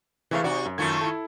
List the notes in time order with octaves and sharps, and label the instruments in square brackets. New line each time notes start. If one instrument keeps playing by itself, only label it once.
[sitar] C3 G#3 A3 [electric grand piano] E3 E5 F5
[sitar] C3 D#4 F#4 [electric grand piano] D5
[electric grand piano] F#2
[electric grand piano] F#2 G#6 [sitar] D#3 A3 F4
[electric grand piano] E4 A4